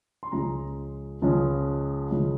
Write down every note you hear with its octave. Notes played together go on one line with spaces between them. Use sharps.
C6
C#2 C#3 F3 G#3 C#4 A#5
C#2 C#3 F3 G#3 C#4
C#3 F3 G#3 C#4